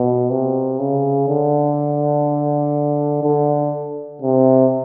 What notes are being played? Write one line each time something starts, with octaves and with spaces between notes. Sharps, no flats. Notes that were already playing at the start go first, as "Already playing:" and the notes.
Already playing: B2
C3
C#3
D3
D3
C3